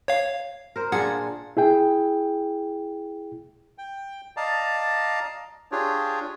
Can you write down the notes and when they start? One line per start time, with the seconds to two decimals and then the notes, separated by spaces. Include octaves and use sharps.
0.08 C#5 F5
0.76 A#4 C5
0.92 A#2 D4 G#4 F#5
1.57 E4 G#4 G5
3.78 G5
4.37 D5 D#5 F5 A5 A#5
5.72 D4 F4 G4 G#4 C#5